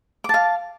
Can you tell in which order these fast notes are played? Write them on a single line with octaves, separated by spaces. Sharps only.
D6 A5 F5